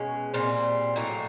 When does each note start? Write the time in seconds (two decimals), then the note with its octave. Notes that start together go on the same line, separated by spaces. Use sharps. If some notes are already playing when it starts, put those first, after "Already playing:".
Already playing: B2 G#3 C#4
0.34 A#2 G3 C4
0.96 A2 F#3 A#3 D#4